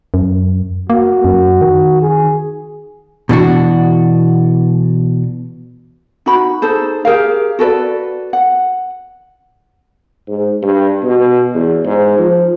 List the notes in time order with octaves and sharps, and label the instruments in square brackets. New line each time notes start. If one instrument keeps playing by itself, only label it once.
[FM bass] F#2
[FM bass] A#3 [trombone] F#4
[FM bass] F#2
D#3
[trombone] G#4
[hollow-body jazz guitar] B2 E3 D4 F#4
[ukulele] D#4 F#4 B5
D#4 G#4 A4 C5
G4 G#4 A#4 F5
F#4 A4 B4 D5
F#5
[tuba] G#2
G2
B2
E2
G#2
F3